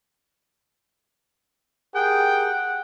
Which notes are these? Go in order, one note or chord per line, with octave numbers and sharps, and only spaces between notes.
G4 G#4 A#4 F#5 G5